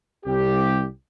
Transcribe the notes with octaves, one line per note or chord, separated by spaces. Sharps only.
C2 G4